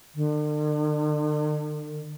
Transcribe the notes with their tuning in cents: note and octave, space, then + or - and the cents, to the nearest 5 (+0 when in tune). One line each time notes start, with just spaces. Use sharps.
D3 +45